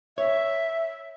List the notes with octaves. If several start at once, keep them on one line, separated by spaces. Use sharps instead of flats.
C#5 E5